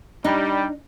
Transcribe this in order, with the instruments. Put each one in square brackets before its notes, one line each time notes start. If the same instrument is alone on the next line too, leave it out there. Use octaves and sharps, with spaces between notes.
[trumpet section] G3 [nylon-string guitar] D4 D#4